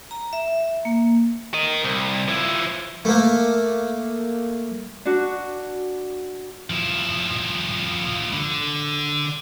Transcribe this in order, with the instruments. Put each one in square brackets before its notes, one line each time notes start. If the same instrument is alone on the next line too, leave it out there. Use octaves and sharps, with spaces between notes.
[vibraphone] A#5
E5
A#3
[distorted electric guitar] A#4 D#5
C2
F3 E4
[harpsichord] A3 A#3
[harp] D4 F#4
[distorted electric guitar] F3 E4
D3